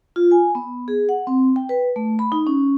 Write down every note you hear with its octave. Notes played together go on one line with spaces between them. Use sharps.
F4
G#5
B3
G#4
F#5
C4
G5
B4
A3
B5
D#4
C#4